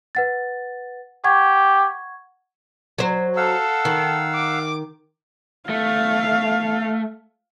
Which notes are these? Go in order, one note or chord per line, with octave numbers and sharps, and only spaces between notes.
B4 F#5 A6
G4 F#5 C#6 G#6
F#3 C5
A4 F5 F#5 E6
D#3
D6
A3 F5